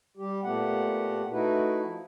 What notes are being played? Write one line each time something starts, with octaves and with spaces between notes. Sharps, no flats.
G3 G4
A#2 A3 B3 G4 F#5
A3 D#4 E4 F#4 B4
F3